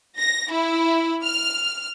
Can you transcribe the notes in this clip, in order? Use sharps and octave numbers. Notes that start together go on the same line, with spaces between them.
A#6
E4
F6